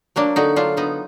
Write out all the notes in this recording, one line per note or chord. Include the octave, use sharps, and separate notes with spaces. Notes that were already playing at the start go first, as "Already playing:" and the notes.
F#3 A#3 D4
D3 D#4 F#4
F#3 D4 F4
D3 B3 D#4